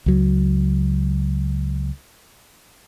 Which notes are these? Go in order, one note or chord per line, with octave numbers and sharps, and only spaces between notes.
C#2 F#3